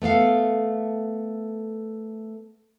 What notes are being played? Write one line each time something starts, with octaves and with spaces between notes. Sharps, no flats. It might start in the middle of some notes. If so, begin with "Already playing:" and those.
A3 B3 A4 F5